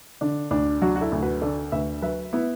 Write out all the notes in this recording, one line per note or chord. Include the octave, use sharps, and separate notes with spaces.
D3 D4
D2 D4
F#3 D4 F#4
F#4
E4 A4
D2
F#4 B4
D3 A4 D5
D2 B4 E5
F#3 B4 E5
B3 E4